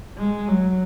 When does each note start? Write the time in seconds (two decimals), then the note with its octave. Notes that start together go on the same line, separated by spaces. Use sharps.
0.18 G#3
0.48 F#3